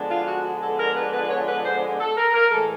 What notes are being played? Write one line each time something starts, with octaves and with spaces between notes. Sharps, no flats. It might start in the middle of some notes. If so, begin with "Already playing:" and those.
Already playing: D3 F3 G#3 B3 D4
F4
F#4
A4
A#4
B4
B4
C#5
B4
C5
A4
A#4
A#4
A2 E3 G#3 A4